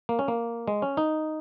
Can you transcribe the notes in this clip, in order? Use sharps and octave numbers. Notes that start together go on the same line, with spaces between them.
A#3
C#4
A#3
G#3
C#4
D#4